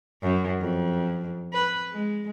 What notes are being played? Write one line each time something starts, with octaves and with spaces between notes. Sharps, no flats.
F#2
F2
B4
G#3